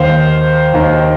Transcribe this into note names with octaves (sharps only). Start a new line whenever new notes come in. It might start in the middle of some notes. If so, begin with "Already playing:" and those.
Already playing: D#2 D#3 C5 F5
D#2 D#3